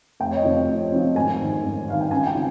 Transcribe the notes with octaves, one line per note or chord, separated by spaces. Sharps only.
F1 G5
C#5
D#5
F2 C3 F3
D#5
F1
F2 C3 F3
G#1 G#5
G2 D#3
G#1
G2 D#3 F5
G5
C#2 G#5
G5
C3 F3